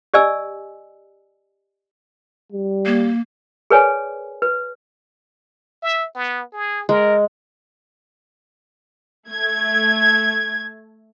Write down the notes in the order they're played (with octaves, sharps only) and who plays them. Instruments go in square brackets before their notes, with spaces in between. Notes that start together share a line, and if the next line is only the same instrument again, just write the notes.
[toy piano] G4 D5 D#5 G#5 E6
[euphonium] G3
[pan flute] A#3
[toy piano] G#4 A#4 B4 C#5 D5 G#5
B4
[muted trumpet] E5
B3
G#4
[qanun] G#3 [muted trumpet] A#4
[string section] A3 G#6